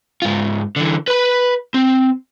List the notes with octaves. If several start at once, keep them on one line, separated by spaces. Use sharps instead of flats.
G#2 F4
D3 E3
B4 B5
C4